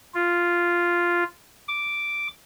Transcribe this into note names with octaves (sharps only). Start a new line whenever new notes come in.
F4
D6